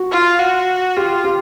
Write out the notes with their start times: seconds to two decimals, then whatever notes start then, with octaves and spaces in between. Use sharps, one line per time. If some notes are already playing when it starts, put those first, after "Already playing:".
Already playing: F#4
0.12 F4
0.39 F#4
0.96 F4 G4
1.24 G4